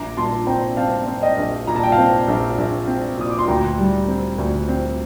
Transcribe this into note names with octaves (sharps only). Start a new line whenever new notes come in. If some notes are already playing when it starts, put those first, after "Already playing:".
Already playing: A#1 A#5 D6
A#2 A5 C6
C4 G5 A#5
C4 F5 A5
C4
D#5 G5
A#1
A#2 A#5
A5
G5
F5 A5
C4
A#1
A#1
C4
A#2 D#6
D6
C6
D2 G5 A#5
G3
C4
D2
C4